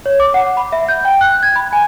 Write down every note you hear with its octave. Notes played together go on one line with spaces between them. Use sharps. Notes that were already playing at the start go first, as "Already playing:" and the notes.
C#5
D6
F#5
B5
E5
G6
G5
F#6
G#6
B5
G#5